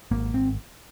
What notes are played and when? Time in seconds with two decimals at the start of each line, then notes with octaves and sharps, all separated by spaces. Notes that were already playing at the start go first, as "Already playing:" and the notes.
0.11 G#1 A#3
0.34 G#1 C4